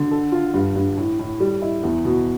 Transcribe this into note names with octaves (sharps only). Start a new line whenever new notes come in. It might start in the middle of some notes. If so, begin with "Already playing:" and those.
Already playing: D3
A4
F4
G2
G2
A2
A2
G3
E4
E2
B2